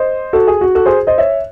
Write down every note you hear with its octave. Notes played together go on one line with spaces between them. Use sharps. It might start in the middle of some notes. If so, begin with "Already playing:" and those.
Already playing: C5 D#5
F#4 A4
G#4
F#4
F#4 A4
G#4 C5
C5 D#5
C#5 E5